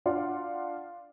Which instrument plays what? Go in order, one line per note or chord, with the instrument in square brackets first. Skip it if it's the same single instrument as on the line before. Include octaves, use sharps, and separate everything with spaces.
[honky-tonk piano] D4 F4 D5 F5 F#5 C6